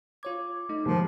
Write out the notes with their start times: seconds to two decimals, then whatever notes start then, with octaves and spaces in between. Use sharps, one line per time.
0.23 F4 C#5 D6 G#6
0.69 A3 D#4
0.85 D#2 G#2 F3 A#4